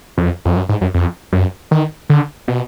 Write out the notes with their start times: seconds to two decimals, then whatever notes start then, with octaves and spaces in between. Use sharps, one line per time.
0.18 F2
0.45 F2
0.56 F#2
0.69 G#2
0.81 F#2
0.94 F2
1.32 F#2
1.71 D#3
2.09 D3
2.48 B2